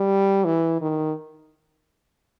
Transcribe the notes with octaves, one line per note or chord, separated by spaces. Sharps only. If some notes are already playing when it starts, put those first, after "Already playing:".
Already playing: G3
E3
D#3